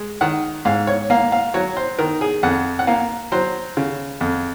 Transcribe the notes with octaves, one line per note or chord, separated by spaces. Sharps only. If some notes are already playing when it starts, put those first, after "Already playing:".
Already playing: G#3
D#3 F#5
G#2 F5
C#5
A#3 F5
F5
F#3 C#5
C5
D#3 A#4
G#4
F2 F#5
F#5
A#3 F5
F#3 C5
C#3
F2